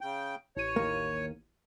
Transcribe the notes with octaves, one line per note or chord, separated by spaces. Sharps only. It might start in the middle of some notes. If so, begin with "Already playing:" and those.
C#3 G5
A1 C#5 D#7
D#2 A#3